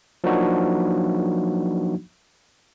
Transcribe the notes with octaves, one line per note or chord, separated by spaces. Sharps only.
F3 F#3 A#3 D4 D#4 F#4